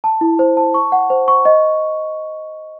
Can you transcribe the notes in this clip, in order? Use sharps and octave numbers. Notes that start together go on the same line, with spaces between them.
A5
E4
C5
A5
C#6
F#5
C5
C#6
D#5